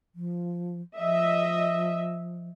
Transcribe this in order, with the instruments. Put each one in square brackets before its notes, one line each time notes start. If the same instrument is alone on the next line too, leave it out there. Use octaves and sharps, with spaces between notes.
[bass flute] F3
[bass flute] F3 [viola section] D#5 E5